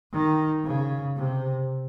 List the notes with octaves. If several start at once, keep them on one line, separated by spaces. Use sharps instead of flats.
D#3
C#3
C3